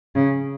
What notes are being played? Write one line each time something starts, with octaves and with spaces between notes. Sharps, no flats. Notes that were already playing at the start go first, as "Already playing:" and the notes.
C#3